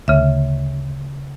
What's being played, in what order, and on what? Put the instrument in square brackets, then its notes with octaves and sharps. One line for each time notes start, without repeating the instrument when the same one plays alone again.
[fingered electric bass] D2 [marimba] C#3 E5